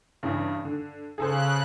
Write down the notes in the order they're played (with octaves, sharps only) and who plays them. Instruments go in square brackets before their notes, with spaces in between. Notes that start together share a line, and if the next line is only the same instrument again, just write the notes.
[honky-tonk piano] G2 C#3 E3
D3
[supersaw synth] C#3 F#6 [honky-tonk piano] G#4 A4 C5